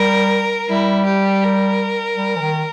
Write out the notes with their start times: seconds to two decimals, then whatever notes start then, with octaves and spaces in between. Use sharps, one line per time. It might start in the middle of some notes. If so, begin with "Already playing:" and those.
Already playing: G3 A#4
0.69 G3 E4
1.06 G4
1.44 A#4
2.16 G3
2.36 E3
2.41 D#3